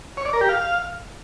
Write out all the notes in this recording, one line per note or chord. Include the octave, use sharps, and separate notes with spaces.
C#5
D5
A#4
G4
F5